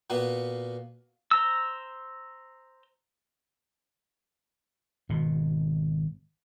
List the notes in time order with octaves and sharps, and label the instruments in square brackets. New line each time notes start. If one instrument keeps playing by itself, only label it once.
[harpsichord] A#2 A#3 B3 F#4
[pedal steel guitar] C5 A#5 E6
[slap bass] G#1 B2